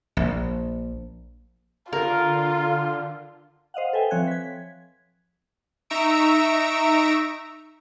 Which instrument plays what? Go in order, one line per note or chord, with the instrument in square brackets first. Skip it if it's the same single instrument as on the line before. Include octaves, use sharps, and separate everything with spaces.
[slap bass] A#1
[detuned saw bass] D3 [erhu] F4 [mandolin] A#4
[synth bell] C5 D#5 F5 F#5
A4 B4 E5 G5 G#5
F3 C4 C#5 F#6 G#6
G#6 B6
[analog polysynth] D#4 E5 A#5 C#6 E6 D7